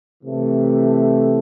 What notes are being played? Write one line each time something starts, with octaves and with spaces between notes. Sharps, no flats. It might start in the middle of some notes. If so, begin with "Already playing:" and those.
C3 E3 A3